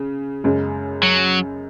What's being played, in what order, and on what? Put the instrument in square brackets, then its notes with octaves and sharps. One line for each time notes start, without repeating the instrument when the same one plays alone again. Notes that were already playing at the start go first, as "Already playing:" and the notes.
Already playing: [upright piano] C#3
F#2 C#3 G#3
[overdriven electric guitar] F#3